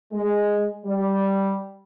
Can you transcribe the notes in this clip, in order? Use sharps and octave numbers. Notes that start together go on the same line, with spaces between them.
G#3
G3